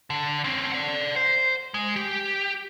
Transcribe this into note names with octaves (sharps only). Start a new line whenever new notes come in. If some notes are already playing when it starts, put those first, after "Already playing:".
D3
C4 C#4
D5 F#5
C5
G#3
G4